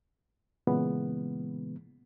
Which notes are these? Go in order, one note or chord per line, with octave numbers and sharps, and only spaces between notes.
A#2 C#3 E3 G#3 B3